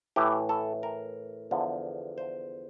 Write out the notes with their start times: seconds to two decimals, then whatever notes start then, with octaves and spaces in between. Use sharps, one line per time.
0.16 A2 E3 G4
0.49 A4
0.83 A#4
1.51 E2 D3 F3
2.18 C5